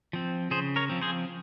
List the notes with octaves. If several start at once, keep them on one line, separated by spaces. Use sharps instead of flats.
F3 C4
C#3 G#4 C5
A#4 C#5
F3 C4
G#4 C5